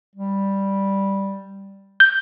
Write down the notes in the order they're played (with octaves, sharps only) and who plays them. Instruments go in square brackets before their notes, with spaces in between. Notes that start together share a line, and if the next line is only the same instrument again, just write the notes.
[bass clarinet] G3
[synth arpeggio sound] G6